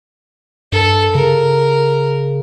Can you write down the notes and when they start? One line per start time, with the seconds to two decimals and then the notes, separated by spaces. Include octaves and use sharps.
0.72 G2 A4
1.15 C#3 A#4